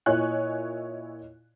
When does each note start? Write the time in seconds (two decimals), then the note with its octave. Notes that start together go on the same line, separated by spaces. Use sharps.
0.06 A#2 E4 C#5 D#5 G#5 F#6